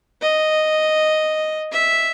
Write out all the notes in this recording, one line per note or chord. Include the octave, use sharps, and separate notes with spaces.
D#5
E5